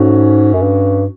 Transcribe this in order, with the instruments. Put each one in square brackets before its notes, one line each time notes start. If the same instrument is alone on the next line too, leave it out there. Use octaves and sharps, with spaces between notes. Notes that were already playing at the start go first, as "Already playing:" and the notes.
Already playing: [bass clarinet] G#2 [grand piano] A3 C#4 F#4
[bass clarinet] F#2
G2